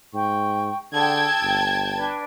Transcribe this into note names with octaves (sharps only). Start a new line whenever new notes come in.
G#2 G5 C#6
D3 G#4 G5 A5 E6 G#6
G1
D4 B4 D5